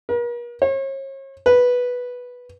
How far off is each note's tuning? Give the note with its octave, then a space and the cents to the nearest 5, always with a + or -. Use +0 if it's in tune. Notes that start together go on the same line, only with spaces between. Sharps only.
A#4 +45
C#5 -40
B4 -5